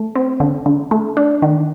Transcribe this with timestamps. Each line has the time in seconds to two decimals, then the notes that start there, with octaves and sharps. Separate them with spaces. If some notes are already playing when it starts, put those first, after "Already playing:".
Already playing: A3
0.15 C4
0.40 D3
0.66 D3
0.91 A3
1.17 D4
1.42 D#3